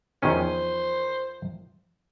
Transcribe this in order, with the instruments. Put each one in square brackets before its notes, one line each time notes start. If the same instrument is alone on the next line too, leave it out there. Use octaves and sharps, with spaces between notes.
[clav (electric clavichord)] E2 D#3 C#4 [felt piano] F3 D#7 [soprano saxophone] C5